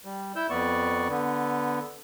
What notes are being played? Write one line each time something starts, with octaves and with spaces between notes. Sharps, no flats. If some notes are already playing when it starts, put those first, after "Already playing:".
G3
E4 E6 G6
F2 B3 D5 C#6
D3 B3